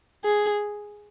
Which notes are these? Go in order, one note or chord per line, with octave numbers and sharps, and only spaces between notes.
G#4